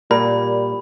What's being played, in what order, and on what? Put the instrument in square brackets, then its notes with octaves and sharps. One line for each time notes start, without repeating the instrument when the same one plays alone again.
[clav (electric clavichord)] A#2 [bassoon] G3 [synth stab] A#4 [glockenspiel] B5